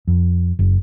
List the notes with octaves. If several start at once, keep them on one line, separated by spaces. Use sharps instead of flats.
F2
F#1